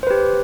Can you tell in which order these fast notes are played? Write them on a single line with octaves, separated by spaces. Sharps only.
C5 B4 G4